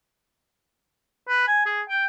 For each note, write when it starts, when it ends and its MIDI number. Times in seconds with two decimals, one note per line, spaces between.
1.28 1.47 71
1.48 1.65 80
1.66 1.81 68
1.89 2.06 79